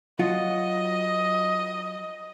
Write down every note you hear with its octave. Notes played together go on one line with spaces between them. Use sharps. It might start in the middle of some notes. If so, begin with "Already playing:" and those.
F#3 F4 F#4 D#5